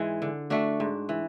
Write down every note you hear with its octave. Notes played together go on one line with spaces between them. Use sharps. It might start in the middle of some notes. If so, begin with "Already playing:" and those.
Already playing: G#2 E3 G#3
D3
A3 D4 F#4
G#2
E3